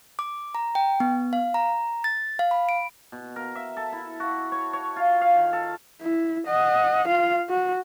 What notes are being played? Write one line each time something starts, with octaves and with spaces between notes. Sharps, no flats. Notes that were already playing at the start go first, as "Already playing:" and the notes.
D6
A#5
G5
B3
F5
A#5
A6
F5
B5
D7
B2
A#4
E5
A4
E4
F#4
C#5
C#5
F4
F5
D#3
A4
E4
D#5 F#5
F4 F5
F#4